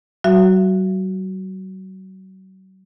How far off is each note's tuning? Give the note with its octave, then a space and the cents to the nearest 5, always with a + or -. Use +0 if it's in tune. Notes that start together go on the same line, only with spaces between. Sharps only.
F#3 +40 F#4 +0 E5 +35